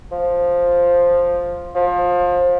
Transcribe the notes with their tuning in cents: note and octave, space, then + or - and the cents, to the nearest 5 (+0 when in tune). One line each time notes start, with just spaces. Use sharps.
F3 +5
F3 +25